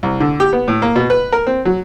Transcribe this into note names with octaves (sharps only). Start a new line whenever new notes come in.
C2
D3
G4
B3
A2
A#3
B2
B4
A#4
C4
F#3